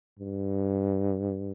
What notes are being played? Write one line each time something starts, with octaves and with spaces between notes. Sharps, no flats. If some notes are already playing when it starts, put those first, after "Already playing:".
G2